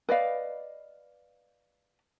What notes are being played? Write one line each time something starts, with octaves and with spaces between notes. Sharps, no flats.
B4 D5 D#5 F5